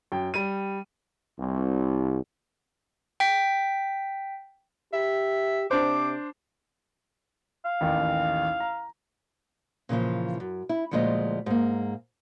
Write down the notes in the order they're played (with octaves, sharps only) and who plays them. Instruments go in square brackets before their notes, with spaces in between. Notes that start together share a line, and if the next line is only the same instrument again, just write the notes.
[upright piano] F#2 G5
G3 D#7
[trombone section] C2
[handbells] G5 B6
[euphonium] G4 [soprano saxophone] E5
[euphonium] C3 [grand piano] D4 C5 [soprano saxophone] D6
[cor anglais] F5
[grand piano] A1 D#2
A#5
[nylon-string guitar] A#2 C#3 E3 F3
F#2
E4
D2 A#2 F3 G#3 C#5 D#5
G#2 A#3